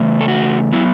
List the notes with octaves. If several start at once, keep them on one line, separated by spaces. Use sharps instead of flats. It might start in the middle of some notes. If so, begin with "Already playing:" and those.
Already playing: E2 C#3 A3
A4
F#4
F#3 B3 E4